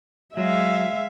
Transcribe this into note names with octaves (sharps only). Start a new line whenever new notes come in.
F#3 G#3 E5 F5